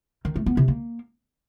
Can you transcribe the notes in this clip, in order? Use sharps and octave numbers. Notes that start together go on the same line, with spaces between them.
D#3
A3
B3
C3
A#3